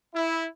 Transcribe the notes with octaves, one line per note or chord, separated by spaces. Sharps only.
E4